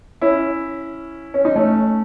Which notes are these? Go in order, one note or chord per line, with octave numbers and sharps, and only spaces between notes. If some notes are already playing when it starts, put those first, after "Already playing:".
C#4 E4
C#4
D#4
A3 C#4